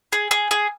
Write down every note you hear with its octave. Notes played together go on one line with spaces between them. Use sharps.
G#4
G#4
G#4